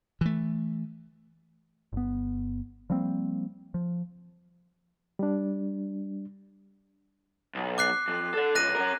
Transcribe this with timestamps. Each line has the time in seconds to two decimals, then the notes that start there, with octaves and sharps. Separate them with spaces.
0.21 E3 A3
1.93 G1 B3
2.90 F3 G3 A#3 C4
3.74 F3
5.19 G3 D4
7.55 B1
7.78 D6 F#6 C7
8.07 F2
8.34 A4 D5
8.55 C#2 F#6 A#6 D#7
8.75 C#4 A#4